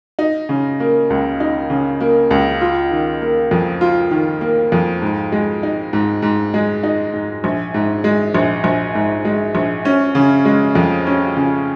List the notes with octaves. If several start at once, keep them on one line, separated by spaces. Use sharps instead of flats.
D#4
C#3
A#3
C#2
D#4
C#3
A#3
C#2
F4
D#3
A#3
F2
F4
D#3
A#3
F2
G#2
G#3
D#4
G#2
G#2
G#3
D#4
G#2
A#1
G#2
G#3
A#1
A#1
G#2
G#3
A#1
C#4
C#3
G#3
F2
C#4
C#3